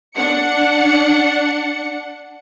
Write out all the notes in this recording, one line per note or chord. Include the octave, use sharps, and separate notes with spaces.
D4 F#5 C#7